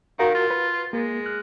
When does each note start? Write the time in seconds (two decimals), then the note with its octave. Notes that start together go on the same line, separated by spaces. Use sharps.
0.19 D#3 F#4 A#4 F5
0.35 F4
0.51 B4
0.93 G#3 A#3
1.26 F6 F#6